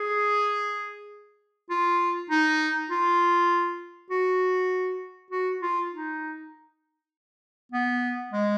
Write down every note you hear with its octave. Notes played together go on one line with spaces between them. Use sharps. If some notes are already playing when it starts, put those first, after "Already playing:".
Already playing: G#4
F4
D#4
F4
F#4
F#4
F4
D#4
B3
G#3